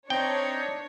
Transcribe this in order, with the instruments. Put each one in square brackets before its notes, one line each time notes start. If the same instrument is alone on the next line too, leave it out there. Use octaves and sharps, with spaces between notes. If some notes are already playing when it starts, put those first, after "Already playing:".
[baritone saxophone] C4 [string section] D4 C#5 [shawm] D#4 [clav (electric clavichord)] G5